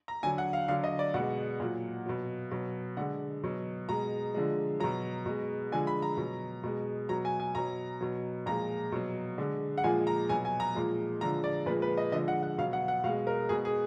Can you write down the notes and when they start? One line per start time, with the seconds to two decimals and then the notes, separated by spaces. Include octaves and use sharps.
0.08 A#5
0.23 D3 F#3 G#5
0.38 F#5
0.53 F5
0.68 D3 F#3 F5
0.84 D#5
0.99 D5
1.14 B2 G#3 F#5
1.60 A#2 F#3
2.06 B2 F#3
2.51 B2 F#3
2.97 D3 G#3 F#5
3.44 B2 F#3
3.89 B2 G#3 A#5
4.34 D3 F3 G#3
4.80 B2 F#3 A#5
5.26 B2 G#3
5.72 D3 F3 G#3 G#5
5.87 B5
6.02 A#5
6.17 B2 F#3
6.64 B2 G#3
7.09 B2 F#3 A#5
7.25 G#5
7.40 G#5
7.55 B2 F#3 A#5
8.01 B2 F#3
8.46 A#2 F3 G#3 A#5
8.92 B2 F#3
9.38 D3 G#3
9.78 F#5
9.84 A#2 F3 G#3 G#5
10.07 A#5
10.29 B2 F#3 G#5
10.45 G#5
10.60 A#5
10.75 A#2 F3 G#3
11.21 D3 F3 G#3 A#5
11.44 D5
11.66 A#2 F3 G#3 B4
11.82 B4
11.97 D#5
12.12 D3 F3 G#3 D#5
12.28 F#5
12.43 F#5
12.58 B2 F#3 F5
12.73 F#5
12.88 F#5
13.04 B2 F5
13.07 G#3
13.27 A#4
13.49 B2 G#3 G#4
13.65 G#4